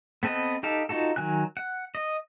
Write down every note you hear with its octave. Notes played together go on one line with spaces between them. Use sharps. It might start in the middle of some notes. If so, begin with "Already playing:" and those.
B3 C4 A4 B4 D#5
D#4 G4 A4 F5
D#4 F4 F#4 A4
D#3 F#3 G#5 F#6
F#5
D#5